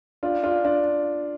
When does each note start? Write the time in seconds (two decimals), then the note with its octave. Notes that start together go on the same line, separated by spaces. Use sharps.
0.23 D4 F4
0.43 D4 F4
0.65 D4 F4